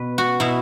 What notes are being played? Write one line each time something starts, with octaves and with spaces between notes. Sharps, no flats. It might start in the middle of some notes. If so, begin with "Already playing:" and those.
Already playing: B2 B4
F#4
B2 E4